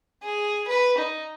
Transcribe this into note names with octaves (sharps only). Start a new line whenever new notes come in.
G#4
B4
D#4